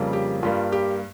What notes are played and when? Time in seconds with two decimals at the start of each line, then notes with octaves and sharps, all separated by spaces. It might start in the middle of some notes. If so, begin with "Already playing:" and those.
Already playing: F2 C#3 G3 A#3
0.13 G4
0.43 G2 G3 A#3 F4
0.72 G4